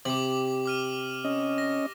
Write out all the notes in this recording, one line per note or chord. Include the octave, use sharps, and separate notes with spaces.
C3 G4 D6 F#7
D6 F6 D#7
C#4 D#5
A#6